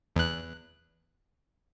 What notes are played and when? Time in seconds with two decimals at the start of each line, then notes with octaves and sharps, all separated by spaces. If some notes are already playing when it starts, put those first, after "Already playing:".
0.16 E2 F#6